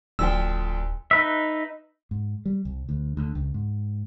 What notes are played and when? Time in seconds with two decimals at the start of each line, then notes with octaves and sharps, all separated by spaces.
0.19 D1 D2 F3 G5 E6
1.11 D#4 B4 E5
2.11 G#2
2.45 G3
2.65 C2
2.89 D2
3.17 D2
3.35 C#2
3.54 G#2